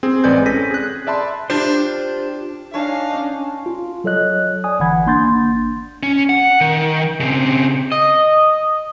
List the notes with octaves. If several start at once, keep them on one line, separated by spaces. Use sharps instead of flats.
C4 G#4
A1 G#3 B4 D5 G#5 G6
C4 C#4 A4 A#6 B6 D#7
G#4 F#6
D5 E5 A5 B5 C6
D4 F4 G4 C5
D4 D#4 C#5 F5 G#5 A5
C#4
F4
F#3 A4 C#5 D#5 F#6
D5 G#5 D#6
G1 D3 E3 F#5 B5 G#6
G#1 A#3 D4 C6 G6 A6
C#4
F#5
D#3
C#3 C4
D#5